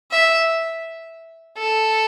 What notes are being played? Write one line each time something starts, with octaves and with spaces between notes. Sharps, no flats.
E5
A4